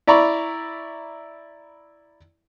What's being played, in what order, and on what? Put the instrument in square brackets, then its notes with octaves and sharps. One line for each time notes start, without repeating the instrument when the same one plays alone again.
[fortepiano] E4 D5 A#5 B5 C#6